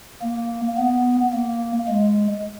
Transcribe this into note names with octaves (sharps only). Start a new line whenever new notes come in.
A#3
B3
A#3
G#3